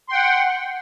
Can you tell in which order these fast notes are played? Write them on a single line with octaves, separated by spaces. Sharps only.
C6 G5 F#5